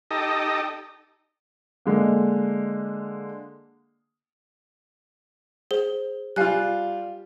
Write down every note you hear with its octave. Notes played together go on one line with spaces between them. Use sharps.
D#4 G4 A4 D#5
D3 G#3 A#3
G#4 C5 G7
G3 F4 F5 G#5 F#6